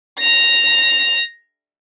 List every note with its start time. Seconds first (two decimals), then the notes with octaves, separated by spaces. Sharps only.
0.20 A#6 F7